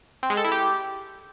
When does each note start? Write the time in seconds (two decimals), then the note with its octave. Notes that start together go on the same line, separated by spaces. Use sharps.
0.23 C4
0.30 G#3
0.37 A4
0.44 E4
0.52 G4